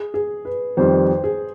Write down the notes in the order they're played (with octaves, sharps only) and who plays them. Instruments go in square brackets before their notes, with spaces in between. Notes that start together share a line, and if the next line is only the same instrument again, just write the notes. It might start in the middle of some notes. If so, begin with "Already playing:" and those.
Already playing: [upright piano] G#4
G#4
B4
[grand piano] F2 D#3 G3 [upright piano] C5
[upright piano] G#4